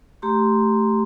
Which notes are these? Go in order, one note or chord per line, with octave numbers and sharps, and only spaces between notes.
A3 G4 A#5 C6